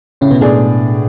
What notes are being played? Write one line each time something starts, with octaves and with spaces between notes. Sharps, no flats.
A2 C#3 C#4
B2 B3
A2 G#3 A3 D4 G#4 D5